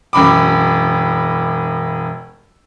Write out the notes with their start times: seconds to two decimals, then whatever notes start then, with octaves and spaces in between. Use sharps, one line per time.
0.13 E1 F#2 B5 D6